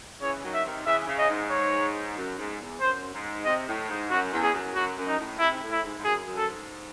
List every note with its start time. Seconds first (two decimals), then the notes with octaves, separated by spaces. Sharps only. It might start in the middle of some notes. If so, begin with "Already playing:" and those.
0.21 C#3 E3 C#5
0.44 D#3 F#3
0.54 E5
0.65 C3 D#3
0.86 C#3 E3 E5
1.07 C#3
1.18 D#5
1.29 G#2
1.51 C#5
2.16 F#2
2.37 G#2
2.59 E2
2.80 F#2 C5
3.13 G#2
3.45 C3 D#5
3.67 A2
3.88 G#2
4.10 F#2 F#4
4.32 E2
4.42 G#4
4.53 F#2
4.75 F#2 F#4
4.96 F#2
5.07 D#4
5.18 A2
5.39 C3 E4
5.51 G#2
5.61 A2
5.71 E4
5.83 G#2
5.98 G#2
6.04 F#2 G#4
6.25 F#2
6.37 A4
6.47 G#2